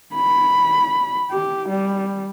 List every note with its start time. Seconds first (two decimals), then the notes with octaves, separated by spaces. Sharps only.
0.15 B5
1.31 G4
1.69 G3